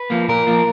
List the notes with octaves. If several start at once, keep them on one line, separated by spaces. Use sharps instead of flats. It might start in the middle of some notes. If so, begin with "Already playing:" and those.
Already playing: B4
F3 A#3
A#2 A#4
F3 A#3